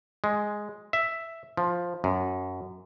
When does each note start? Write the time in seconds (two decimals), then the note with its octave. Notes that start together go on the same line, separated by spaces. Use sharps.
0.24 G#3
0.93 E5
1.57 F3
2.04 F#2